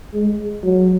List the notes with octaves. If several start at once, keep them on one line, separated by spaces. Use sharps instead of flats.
G#3
F#3